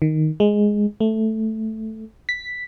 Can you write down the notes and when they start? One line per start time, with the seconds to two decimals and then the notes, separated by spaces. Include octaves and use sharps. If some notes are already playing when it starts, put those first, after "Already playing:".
0.02 D#3
0.40 G#3
1.00 A3
2.29 B6